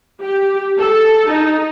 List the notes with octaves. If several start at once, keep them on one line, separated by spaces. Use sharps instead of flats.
G4
A4
D#4